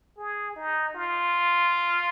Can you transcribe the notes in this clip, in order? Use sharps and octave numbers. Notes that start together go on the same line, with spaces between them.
G#4
D#4
F4